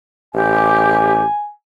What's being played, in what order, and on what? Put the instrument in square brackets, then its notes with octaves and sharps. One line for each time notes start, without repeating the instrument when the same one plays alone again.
[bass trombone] A1 [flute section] G4 [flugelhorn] G#5